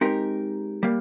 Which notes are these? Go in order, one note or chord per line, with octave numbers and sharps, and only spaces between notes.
G#3 C4 D#4 G4 A#4
G3 A#3